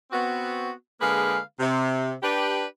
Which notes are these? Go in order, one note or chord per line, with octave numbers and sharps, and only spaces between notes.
B3 C4 F#4
D3 G#3 A#3 G#4 B4 F5
C3
D4 G4 B4